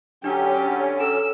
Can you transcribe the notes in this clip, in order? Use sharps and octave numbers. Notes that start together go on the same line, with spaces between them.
D3 F#3 C#4 D4 G4 G5
A4 E6